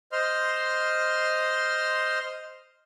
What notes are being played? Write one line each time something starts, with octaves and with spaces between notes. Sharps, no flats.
C5 D#5 C6 F6